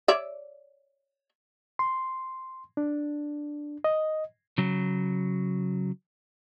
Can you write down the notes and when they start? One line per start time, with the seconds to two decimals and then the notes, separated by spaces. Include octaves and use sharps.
0.08 C#5 D5 E5
1.79 C6
2.77 D4
3.84 D#5
4.58 C#3 F#3